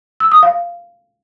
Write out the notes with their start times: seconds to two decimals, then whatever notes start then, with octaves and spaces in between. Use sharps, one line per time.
0.20 E6
0.32 D#6
0.43 F5